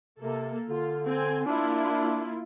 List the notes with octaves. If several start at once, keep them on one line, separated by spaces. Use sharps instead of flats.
C3 A#3 A4
D3 F4
C4 G#5
A#3 D4 E4 F4